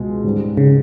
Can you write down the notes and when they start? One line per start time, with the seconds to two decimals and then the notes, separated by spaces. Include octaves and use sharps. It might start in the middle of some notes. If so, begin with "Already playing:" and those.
Already playing: C#2 B2 G#3
0.24 G#2 G3 C#4
0.57 C#3